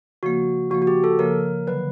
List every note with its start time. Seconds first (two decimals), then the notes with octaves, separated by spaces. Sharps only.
0.23 C#3 F3 A#3 F#4
0.70 C#3 F3 A#3 F#4
0.82 F#4
0.87 G4
1.04 A4
1.19 C#3 F3 A#3 A#4
1.67 D3 F#3 B4